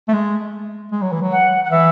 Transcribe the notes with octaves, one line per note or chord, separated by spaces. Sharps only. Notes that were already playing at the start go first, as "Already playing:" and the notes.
A3
G#3
G#3
F#3
E3
F#3
F#5
F#5
E3 E5